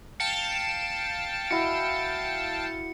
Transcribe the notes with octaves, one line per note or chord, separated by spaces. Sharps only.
F5 G5 A5 C#7
E4 F#4 C#7